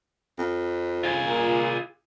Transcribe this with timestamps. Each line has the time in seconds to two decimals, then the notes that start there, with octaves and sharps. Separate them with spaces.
0.39 F2
1.04 F4 G#4
1.26 A#2